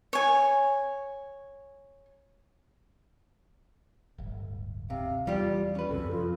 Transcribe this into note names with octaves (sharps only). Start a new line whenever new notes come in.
C#5 G#5
D1 G1
C3 F5
E2 G3 F4 G4 D5
C#4 B4
C#2 F#2 C3 A4
F2 F4